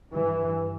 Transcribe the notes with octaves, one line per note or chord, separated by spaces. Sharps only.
G2 E3